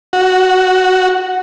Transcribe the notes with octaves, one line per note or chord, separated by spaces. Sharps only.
F#4